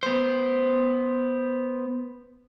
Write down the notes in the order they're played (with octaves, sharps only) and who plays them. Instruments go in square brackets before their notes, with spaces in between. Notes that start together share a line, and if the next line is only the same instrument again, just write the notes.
[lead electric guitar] B3 C5